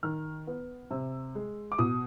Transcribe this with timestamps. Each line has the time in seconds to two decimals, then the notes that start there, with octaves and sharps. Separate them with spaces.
0.03 D#3 F6
0.47 B3
0.91 C3 E6
1.35 G#3
1.72 D6
1.78 B2 D#6